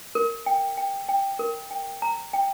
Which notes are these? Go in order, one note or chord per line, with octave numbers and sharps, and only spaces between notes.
A#4
G5
G5
G5
A#4
G5
A#5
G5